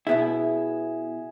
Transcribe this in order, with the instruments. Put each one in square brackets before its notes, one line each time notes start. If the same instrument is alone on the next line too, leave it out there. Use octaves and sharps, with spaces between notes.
[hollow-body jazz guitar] B2 B3 E4 [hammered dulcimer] G#4 E5